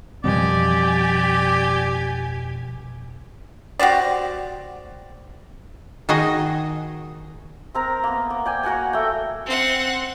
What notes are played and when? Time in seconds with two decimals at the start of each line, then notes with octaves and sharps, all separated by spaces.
0.24 F2 B2 F3 G3 C4 G4 D5 G#5
3.79 F#4 G4 C5 D5
6.09 D#3 D#4 F#4 G#4 D#5
7.75 C4 A#4 A#5
8.04 A#3 B3
8.30 A#3
8.46 D5 G5 G#5
8.63 A#3 F#4 F#5 G#5
8.93 A3 G5
9.46 C4 F#5